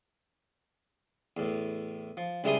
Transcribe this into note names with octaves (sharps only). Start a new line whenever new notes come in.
E2 A2
F3
C#2 G3 E4 G#4 C6 D#6